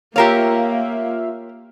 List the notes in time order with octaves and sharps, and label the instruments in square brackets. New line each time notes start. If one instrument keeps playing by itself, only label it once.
[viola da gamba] A#3 [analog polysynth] F4 E5 F5 [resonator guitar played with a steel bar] G4 A#4 C#5